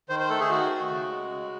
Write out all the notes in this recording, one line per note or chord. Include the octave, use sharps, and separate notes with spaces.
D#3 C5
C5
A3 A4
G#4
D#3 F#4
A3
C#3
G#3
C#3